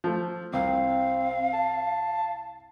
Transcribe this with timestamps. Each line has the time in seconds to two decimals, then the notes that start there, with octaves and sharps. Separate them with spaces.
0.04 F3 A3
0.53 C2 C4 F5
1.53 A5